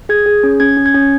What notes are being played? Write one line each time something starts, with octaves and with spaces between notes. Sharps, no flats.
G#4 G#6
G#4
C#4
C#4 G#6
C#4
G#6
C#4